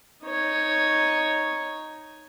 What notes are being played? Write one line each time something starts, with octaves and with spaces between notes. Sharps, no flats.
D#4 C#5